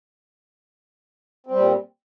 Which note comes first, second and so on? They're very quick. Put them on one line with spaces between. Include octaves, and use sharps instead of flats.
C4 G3 A#2